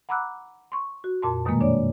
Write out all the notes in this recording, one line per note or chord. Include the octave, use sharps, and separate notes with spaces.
F#5 A#5 B5 D6 E6 F#6
C6 C#6
F#4
F2 A#2 A5 C6
F#2 B2 D#3 G3 G#3 A#3
D4 C#5 D5